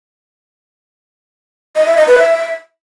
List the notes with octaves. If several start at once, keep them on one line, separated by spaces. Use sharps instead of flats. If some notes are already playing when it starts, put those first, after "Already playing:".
D#5
E5
D#5
B4
E5